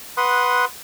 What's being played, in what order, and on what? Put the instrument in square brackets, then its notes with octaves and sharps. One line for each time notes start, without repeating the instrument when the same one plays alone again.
[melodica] B4 F#5 C6 D#6